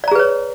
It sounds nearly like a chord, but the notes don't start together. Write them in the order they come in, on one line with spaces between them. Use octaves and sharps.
D5 A#5 G#4 B4 C#5